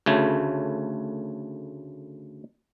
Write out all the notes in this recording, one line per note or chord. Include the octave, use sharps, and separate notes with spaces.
D2 C#3 A3